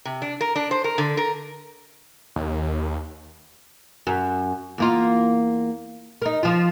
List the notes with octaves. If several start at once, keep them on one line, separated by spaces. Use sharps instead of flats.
C3
D4
A#4
D4
C5
A#4
D3
A#4
D#2
F#2
E2 A#3 F4
D#4 A#4
F3 F4